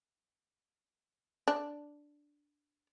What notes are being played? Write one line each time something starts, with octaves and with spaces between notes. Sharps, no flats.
D4